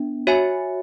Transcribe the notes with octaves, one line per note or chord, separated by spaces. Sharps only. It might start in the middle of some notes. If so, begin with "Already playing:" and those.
Already playing: B3 D4
F#4 C#5 E5 G#5